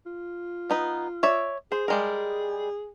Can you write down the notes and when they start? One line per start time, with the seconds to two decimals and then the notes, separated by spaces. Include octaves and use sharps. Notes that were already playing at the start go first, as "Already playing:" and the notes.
0.06 F4
0.70 B3 D#4 B4
1.23 C#5 D5 E5
1.72 G#4 C5
1.88 G3 G#3 A#4